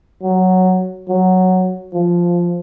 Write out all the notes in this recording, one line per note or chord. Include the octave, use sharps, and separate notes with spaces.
F#3
F#3
F3